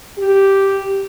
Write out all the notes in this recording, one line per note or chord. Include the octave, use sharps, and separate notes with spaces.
G4